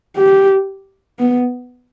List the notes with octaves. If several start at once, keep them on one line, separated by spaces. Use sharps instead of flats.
G4
B3